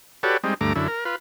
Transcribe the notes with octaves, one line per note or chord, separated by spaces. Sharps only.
F#4 G4 A4 B4 C#5 D5
G3 G#3 C4 D#4
D2 G2 A3 A#5 D6
F#2 D3 E4
A#4
F4 B4